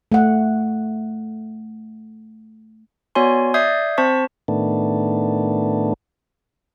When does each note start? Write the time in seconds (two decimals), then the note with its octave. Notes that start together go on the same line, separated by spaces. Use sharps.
0.12 A3 F#5
3.15 B3 F#4 C#5 D5 G#5 C6
3.54 D5 E5 D#6 G6 G#6 C7
3.98 C4 C5 A5 C#6 B6
4.48 A2 D#3 A3 B3 D4